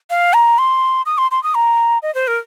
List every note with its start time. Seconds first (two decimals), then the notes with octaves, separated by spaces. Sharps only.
0.10 F5
0.33 A#5
0.58 C6
1.06 D#6
1.18 C6
1.31 C6
1.43 D#6
1.55 A#5
2.02 D#5
2.15 C5
2.27 A#4